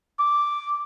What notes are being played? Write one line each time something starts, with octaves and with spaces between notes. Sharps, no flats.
D6